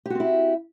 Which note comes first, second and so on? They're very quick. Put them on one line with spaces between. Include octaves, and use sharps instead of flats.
G4 F#4 C4 E4